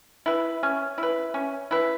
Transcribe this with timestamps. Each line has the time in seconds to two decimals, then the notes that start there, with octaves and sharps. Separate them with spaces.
0.26 E4 B4
0.63 C#4
0.98 E4 B4
1.34 C#4
1.71 E4 B4